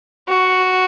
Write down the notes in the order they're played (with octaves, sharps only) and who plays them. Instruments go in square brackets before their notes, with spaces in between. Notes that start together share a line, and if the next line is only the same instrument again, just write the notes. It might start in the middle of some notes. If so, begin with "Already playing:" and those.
[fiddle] F#4